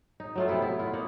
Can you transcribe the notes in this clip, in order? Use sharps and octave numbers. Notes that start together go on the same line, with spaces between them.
D#4
F#3 A3 F4
C3 B3 E4 A4
F#3 E4
B3 E4 F4
A#3 D#4 F#5